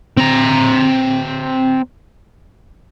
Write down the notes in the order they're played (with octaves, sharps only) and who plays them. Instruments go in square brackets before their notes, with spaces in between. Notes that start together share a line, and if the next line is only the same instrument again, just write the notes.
[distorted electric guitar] C4 A#5